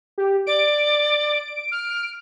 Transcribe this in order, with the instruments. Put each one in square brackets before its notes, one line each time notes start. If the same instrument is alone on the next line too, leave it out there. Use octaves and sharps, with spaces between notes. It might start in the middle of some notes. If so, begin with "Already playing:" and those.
[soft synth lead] G4
[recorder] D5 [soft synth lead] D7
[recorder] F6